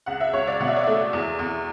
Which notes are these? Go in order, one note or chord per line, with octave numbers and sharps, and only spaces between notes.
C#2 F#5
E5
C#2 C#5
D5
B2 F#5
E5
D5
A3 E5
E2
E2